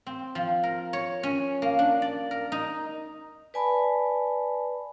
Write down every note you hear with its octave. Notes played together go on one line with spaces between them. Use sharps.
C4
F3
A#4
C#5
C#4
A#3
D4
D5
A#4
D#4
B4 D5 G#5 A5 B5